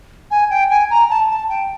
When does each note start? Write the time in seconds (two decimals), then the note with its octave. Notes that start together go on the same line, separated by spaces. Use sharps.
0.31 G#5
0.50 G5
0.70 G#5
0.90 A#5
1.10 A5
1.30 A5
1.49 G5